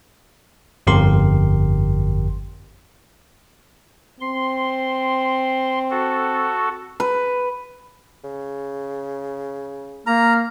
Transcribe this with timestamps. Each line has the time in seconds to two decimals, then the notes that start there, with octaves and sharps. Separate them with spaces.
0.87 G1 F2 G4 A#4 C6
4.21 C4 C6
5.90 F#4 A4
7.00 B4
8.24 C#3
10.07 A#3 A#5 F6